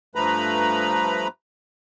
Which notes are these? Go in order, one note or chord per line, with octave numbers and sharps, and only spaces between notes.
G2 F3 A3 B4 A#5 B5